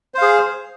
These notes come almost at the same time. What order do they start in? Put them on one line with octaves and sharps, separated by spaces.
C5 F5 G#4